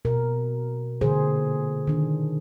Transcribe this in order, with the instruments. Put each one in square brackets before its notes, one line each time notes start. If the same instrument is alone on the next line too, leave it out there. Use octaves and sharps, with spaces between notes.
[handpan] B2 A#4
A#2 D3 E3 G#4 C5
D#3 D4